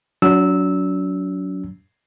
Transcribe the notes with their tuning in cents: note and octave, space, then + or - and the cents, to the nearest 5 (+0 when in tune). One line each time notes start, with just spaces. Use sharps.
F#3 +0 D4 -45 E6 -15